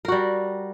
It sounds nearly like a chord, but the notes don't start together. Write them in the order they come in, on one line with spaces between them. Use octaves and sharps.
A#4 F#4 G3